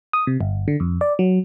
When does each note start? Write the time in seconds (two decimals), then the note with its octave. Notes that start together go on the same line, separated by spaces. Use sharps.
0.13 D#6
0.27 C3
0.41 G1
0.68 D3
0.80 F2
1.01 D5
1.19 F#3